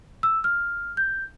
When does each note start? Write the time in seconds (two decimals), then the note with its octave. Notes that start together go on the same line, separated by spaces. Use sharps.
0.23 E6
0.44 F6
0.97 G6